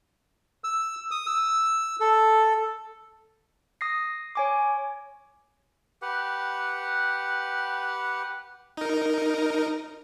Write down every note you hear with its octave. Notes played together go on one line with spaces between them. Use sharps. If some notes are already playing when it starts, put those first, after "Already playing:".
E6
D#6
E6
A4
D#6 A#6 C7
C#5 G#5 D6
G4 B4 F#5
D#4 A#4